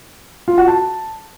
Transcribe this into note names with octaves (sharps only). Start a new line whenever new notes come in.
F4
F#4
A5